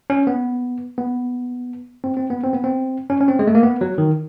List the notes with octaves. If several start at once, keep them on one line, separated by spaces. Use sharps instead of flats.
C#4
B3
B3
C4
C4
B3
C4
B3
C4
C#4
C#4
C4
G#3
A3
A#3
B3
F#3
D#3